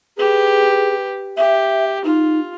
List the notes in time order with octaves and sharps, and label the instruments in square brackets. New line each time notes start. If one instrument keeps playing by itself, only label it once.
[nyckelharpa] G4 B4 [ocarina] G#4
[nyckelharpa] G4 [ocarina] E5
[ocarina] D#4 [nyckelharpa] F4